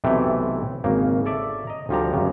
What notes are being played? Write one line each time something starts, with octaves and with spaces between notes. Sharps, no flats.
B1 C3 E3 A3 C4 E4
G#1 C#3 A#3
A4 C#5 D5 E5
D#5 A#5
D2 F3 G3 A#5
F#2 C#3